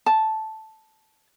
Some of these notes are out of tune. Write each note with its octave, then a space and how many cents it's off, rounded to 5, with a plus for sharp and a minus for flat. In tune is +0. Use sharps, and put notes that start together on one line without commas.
A5 -5